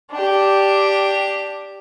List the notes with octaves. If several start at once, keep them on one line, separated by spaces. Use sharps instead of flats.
D4 G4